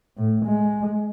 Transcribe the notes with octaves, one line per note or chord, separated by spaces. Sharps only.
A2
G#3